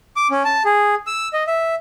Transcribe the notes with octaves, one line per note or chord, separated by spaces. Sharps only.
D6
C#4
A5
G#4
E6
D#5
E5